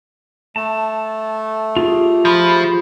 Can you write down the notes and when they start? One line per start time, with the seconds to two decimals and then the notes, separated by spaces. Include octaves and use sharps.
0.56 A3 A5
1.77 F4 G4 G#4
2.25 F3 B5